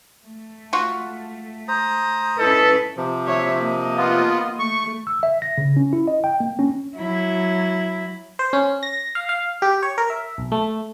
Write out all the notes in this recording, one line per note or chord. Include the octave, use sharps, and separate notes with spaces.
A3
F4 F#4
C5 A#5 D#6
C#4 E4 A4 B4 D#5
C3 F3
C#5 E5
A#3 D#5
B3 F4
A3 C#6
E6
E5
A#6
C#3
C#4
E4
D#5
G5
A#3
C#4
F#3 E4
C5
C#4
A#6
F5
F5
G4
C#5
A#4
E5
B1
A3